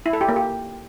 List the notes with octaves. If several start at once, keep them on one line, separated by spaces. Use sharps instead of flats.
E4
A4
G4
A#3
G4